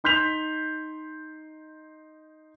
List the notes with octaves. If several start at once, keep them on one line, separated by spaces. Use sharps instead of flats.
D#4 C6 G6 B6 F7